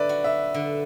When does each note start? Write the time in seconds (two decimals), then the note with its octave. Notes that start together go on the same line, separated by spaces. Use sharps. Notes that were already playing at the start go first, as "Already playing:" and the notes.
Already playing: D3 B4 D5 E5
0.09 F#4
0.24 E5
0.54 D3